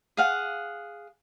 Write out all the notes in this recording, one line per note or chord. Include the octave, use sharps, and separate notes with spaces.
G#4 F5 F#5